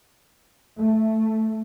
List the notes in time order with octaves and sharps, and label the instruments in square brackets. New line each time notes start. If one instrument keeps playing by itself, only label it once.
[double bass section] A3